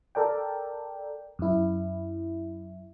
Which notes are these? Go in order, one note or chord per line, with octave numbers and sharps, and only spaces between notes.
A4 A#4 D5 G5
F#2 E4